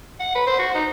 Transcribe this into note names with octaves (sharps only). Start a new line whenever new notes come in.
F#5
B4
C5
F#4
D#4